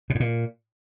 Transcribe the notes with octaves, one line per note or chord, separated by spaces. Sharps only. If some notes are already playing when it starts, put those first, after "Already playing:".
B2
G#2
A#2